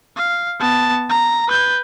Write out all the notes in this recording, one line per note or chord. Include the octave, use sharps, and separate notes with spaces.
F5
B3 A5
A#5
B4 G6